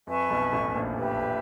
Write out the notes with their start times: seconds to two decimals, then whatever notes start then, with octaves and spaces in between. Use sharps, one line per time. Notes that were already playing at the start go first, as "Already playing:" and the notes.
0.07 F2 B4 E5 G#5 C#6
0.30 B1 B2
0.52 A1 A2
0.75 A#1 A#2
0.98 G4 B4 E5